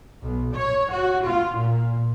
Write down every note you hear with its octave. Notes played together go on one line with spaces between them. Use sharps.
B1
C#5
F#4
F4
A#2